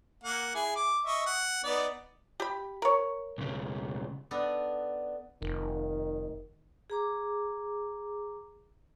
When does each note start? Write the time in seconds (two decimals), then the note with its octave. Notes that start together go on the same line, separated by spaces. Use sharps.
0.24 A#3 F#5
0.55 E4 G#4 G#5
0.76 D6
1.05 D#5 E5 C#6
1.26 F#5
1.64 B3 D#4 D5
2.40 G4 B5
2.82 A#4 C#5
3.38 B1 C#3
4.31 B3 D4 D#4 A4 B4
5.42 F1 D#3
6.90 G#4 A#5 D6